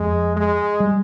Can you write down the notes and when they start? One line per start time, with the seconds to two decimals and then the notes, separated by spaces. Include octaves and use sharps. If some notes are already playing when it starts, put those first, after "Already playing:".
Already playing: F2 F3 G#3
0.36 G#3
0.80 G3